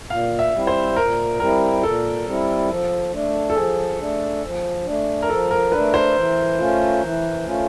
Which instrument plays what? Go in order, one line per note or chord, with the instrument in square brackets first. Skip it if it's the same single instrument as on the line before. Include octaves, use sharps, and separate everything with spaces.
[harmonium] A#2 [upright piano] F5
[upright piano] E5
[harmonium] G3 C4 E4
[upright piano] C5
[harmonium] A#2 [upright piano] A#4
[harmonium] G3 C4 E4 [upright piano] A#4
[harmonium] A#2 [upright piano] A4
[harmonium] G3 C4 E4
F3
A3 D4
[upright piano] A4
[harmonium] F3 [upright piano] G#4
[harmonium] A3 D4
F3
A3 D4
[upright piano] A#4
[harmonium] F3 [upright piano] A4
[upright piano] A#4
[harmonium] A3 D4 [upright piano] B4
[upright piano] C5
[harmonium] E3
A3 C#4 F4
E3
A3 C#4 F4